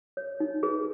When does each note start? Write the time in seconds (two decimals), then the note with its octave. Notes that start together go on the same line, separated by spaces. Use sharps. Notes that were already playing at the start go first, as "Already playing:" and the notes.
0.17 C#5
0.40 D#4
0.63 G#4 B4